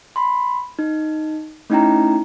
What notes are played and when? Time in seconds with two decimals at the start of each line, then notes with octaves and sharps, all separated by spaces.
0.16 B5 C6
0.79 D#4
1.70 A3 C#4 D#4 E4 G5 A#5